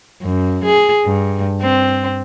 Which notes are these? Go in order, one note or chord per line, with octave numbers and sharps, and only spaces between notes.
F#2
G#4
G2
C4